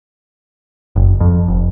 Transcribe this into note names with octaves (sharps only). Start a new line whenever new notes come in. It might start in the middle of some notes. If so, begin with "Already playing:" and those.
F#1
F2
F1